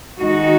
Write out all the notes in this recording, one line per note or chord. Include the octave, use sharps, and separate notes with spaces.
D#3 G#3 D#4 F#4